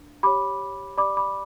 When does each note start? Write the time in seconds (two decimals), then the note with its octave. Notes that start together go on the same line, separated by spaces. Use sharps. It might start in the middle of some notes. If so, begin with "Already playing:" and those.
Already playing: D4
0.23 G4 C#5 B5 D6
0.98 G4 D5 B5 D6
1.17 B5 D6